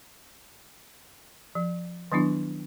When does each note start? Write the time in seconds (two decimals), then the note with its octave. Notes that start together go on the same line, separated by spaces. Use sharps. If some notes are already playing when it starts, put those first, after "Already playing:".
1.55 F3
2.12 D#3 F#3 B3 D4 E4